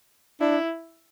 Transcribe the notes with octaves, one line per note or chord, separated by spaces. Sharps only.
D4 E4